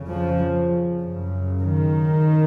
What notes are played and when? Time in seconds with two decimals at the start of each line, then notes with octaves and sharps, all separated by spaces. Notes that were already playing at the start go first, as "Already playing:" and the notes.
Already playing: F2 C#3
0.08 F3
1.00 F#2 C#3
1.61 D#3